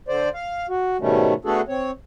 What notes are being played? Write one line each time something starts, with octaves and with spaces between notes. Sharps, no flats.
D3 C5 D5
F5
F#4
G#2 B2 D#3 G3 A3 C#4
A3 B3 D4 F#4 G#4 A4
C4 C#5